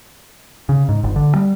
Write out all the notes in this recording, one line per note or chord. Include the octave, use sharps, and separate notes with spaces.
C#3
G#2
G1
D3
G3